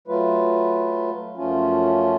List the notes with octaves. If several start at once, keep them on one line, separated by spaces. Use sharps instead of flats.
F#3 A3 F4 B4
F#2 F3 A3 C#4 F4